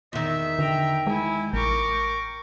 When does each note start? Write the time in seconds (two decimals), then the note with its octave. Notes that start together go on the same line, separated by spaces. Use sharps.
0.13 E2 D#3 E5
0.59 D3 G5 A#5
1.07 G#3 E4 G#5
1.53 A1 A#4 G5 C#6 D6